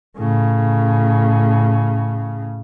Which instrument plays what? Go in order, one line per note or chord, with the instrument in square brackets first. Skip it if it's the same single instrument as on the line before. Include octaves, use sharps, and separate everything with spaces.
[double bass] A2 C#3